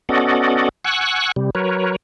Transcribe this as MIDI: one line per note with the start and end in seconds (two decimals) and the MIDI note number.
0.09 0.69 59
0.09 0.69 61
0.09 0.69 66
0.09 0.69 69
0.09 0.69 74
0.09 0.69 75
0.85 1.32 78
0.85 1.32 80
0.85 1.32 85
0.85 1.32 88
0.85 1.32 90
1.36 1.50 48
1.36 1.50 55
1.55 1.96 54
1.55 1.96 70
1.55 1.96 71
1.55 1.96 73